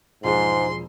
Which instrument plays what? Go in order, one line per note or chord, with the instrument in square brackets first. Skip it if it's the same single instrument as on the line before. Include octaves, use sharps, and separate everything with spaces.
[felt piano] E1 F3 G#4 [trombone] G#2 [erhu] C6